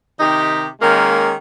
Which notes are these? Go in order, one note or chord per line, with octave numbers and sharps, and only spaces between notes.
C3 D#3 D#4 G4
D#3 G#3 A#3 C#4 F4